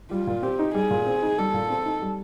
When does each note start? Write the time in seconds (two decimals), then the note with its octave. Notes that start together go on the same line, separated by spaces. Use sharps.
0.11 G3 F4
0.27 A#2
0.43 C4 G4
0.59 D#4
0.74 G3 G#4
0.91 A#2
1.06 C4
1.22 D#4
1.38 G3 A4
1.54 A#2
1.70 C4
1.85 D#4
2.02 G3